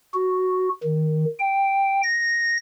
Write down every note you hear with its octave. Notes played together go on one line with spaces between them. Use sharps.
F#4
D#3
G5
A#6